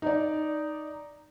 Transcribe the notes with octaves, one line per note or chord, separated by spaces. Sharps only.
D#4 D5